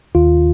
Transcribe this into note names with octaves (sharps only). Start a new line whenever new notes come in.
D#2 F4